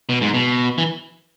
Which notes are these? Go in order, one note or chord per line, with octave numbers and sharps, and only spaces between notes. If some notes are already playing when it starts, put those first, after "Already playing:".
B2
G#2
B2
E3